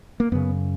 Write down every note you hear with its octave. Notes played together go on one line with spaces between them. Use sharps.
A#3
F#2 C#3 B3